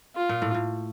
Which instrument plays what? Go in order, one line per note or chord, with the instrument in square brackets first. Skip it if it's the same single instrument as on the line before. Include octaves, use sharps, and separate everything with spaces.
[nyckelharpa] F4
[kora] A#2
A2
A2